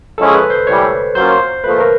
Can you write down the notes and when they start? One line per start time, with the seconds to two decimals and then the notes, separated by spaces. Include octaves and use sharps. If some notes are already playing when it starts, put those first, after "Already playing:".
0.18 F3 G#3 C#4 E4 G#4 A4
0.34 B4
0.50 C5
0.66 A2 E3 G3 C#5
1.15 F#3 A#3 C#4 F4 C5
1.64 A#2 F3 A3 B4
1.80 A#4